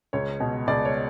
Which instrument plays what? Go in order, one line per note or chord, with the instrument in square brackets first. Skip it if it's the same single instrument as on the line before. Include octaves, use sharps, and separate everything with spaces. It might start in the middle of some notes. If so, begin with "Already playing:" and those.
[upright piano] C#2 C#5
B2
C#2 D5
C#5